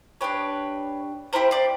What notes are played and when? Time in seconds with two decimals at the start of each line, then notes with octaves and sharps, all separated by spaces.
0.21 D4 G4 B4 C#5
1.33 C4 E4 G4 A#4 C5
1.51 C5 D5